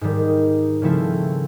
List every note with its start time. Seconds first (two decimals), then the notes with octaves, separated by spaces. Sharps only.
0.01 G#2 D#3 G3
0.82 C#3 F3 A3 C4 E4